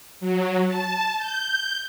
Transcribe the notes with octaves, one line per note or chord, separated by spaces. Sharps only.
F#3
A5
G6